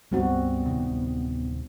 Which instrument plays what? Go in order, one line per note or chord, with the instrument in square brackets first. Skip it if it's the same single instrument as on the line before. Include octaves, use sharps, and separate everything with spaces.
[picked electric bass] C#2 G2 [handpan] G3 C4 F#4 [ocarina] B3
[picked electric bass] D1 C3 D#3